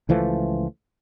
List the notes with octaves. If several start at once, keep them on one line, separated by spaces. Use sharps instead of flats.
C#2 E3 F3 A3